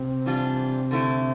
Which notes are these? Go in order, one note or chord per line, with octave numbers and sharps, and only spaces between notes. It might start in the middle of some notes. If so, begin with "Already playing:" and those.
Already playing: C3 C4
E3 G3 D4 F4
D3 A3 E4